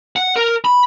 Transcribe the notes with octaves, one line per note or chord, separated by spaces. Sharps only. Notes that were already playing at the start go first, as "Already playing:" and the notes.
F#5
A#4
B5